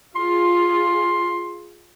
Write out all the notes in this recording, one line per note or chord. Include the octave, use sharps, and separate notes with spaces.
F4 G#4 C6